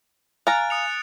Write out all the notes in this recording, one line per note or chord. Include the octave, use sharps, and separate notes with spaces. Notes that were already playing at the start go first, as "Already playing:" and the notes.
F5 G#5 A#5 F#6 A6 D7
D#6 C#7 F7